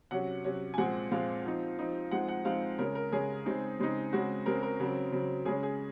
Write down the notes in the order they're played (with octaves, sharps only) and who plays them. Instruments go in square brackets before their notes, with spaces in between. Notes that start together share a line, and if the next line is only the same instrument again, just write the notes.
[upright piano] C3 F#3 C#4 F#5
C3 F#3 C#4
G#5
A#2 F3 G#3 C4 F#5
A#2 F3 G#3 C4 F5
F3 C4 D#4
F3 C4 D#4
F3 G#3 C4 D#4 F#5
F#5
F3 G#3 C4 D#4 F5
C#3 G#3 C#4 A#4
A#4
C#3 G#3 C#4 G#4
C#3 G#3 C4 D#4
C#3 G#3 C4 D#4
C#3 G#3 C4 F#4
C#3 G#3 C4 A#4
A#4
C#3 F#3 C4
C#3 F#3 C4
C#3 G#3 C#4 G#4
G#4